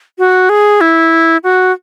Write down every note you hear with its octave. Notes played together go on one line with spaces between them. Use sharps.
F#4
G#4
E4
F#4